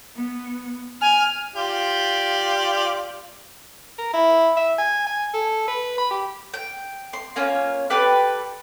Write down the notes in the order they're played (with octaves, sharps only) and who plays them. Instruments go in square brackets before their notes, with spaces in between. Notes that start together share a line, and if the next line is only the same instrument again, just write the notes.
[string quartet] B3
[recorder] G#5 [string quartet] F6
[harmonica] F4 G4 D5
[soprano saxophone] A#4
E4
E5
G#5
G#5
A4
B4
B5
G4
[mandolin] G5
C6
A#3 C#4 F4 C#5
G4 A4 B4 D5